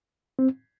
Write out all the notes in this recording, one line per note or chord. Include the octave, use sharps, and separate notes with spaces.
C4